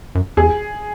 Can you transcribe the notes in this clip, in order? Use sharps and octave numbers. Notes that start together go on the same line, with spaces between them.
F#2
E2 G#4